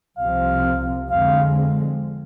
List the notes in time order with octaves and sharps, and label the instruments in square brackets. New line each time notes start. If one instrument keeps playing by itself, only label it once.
[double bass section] C2 C3 F3 C4 [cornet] F5
[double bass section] F2 D3 G#3 C4 [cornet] F5